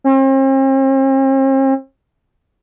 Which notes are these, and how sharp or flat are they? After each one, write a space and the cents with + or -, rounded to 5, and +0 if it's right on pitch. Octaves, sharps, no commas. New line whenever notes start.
C4 +45